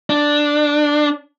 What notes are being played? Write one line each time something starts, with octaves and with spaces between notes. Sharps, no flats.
D4